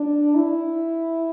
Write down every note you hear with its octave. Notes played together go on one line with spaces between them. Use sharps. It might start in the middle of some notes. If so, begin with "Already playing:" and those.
Already playing: D4
E4